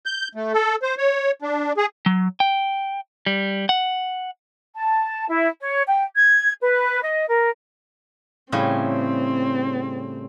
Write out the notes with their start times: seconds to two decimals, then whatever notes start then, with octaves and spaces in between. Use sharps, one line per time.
0.06 G6
0.35 A3
0.53 A4
0.83 C5
0.98 C#5
1.42 D4
1.77 G#4
2.06 F#3
2.40 G5
3.26 G3
3.69 F#5
4.75 A5
5.29 E4
5.60 C#5
5.86 G5
6.15 G#6
6.61 B4
7.04 D#5
7.28 A#4
8.52 A2 C#3 G3 C4